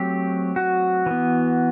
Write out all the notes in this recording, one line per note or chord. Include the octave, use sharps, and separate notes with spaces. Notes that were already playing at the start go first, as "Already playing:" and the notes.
Already playing: F#3 A3 C4 G4
F#4
E3 B3